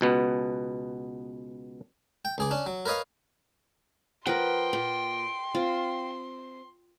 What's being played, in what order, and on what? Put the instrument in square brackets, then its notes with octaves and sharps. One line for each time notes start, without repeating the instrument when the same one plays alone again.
[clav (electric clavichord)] C#2 B2 B3
[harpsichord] G5
C#2 G#4 D6
C#4 D4
F#3
A#4 B4 C#5 D#5 F5
[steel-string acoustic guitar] F3 [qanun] A#4 B4 F#5 [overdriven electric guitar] G5 [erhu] C6
[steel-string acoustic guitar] A#2
[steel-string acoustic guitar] C4 [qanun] F4